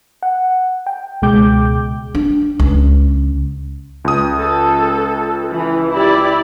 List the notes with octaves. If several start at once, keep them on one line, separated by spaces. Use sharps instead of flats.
F#5
G5
C#2 B2 G#3 G5 D6 G6
D4
C#2
C#2 D#6
A4
E3
E4 G4 D5